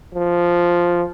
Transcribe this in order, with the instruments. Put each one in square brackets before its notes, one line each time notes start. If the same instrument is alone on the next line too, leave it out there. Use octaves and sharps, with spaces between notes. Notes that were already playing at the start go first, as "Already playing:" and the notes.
[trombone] F3